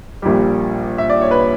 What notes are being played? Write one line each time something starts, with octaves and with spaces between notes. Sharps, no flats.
A#1 A#2 G3 G4
E5
D5
C#5
B4